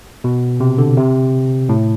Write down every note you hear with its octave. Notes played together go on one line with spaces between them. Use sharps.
B2
C3
D3
C3
A2